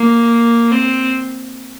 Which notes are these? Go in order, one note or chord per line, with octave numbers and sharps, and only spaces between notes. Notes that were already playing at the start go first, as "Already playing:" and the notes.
Already playing: A#3
C4